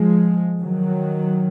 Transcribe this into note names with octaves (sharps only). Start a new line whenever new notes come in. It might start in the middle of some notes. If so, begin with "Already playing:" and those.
Already playing: F3 G#3
D#3 F#3